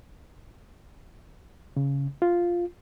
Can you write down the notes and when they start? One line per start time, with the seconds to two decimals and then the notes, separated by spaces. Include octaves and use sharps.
1.77 C#3
2.22 F4